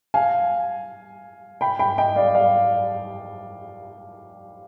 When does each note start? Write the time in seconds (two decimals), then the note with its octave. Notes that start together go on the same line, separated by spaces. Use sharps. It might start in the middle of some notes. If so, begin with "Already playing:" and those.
0.14 F5 G#5
1.61 G5 B5
1.79 G5 B5
1.98 D#5 G5
2.16 D5 F5
2.35 D5 F5